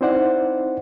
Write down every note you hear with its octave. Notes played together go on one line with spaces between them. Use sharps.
C4 D#4 E4 C5 D5 F#5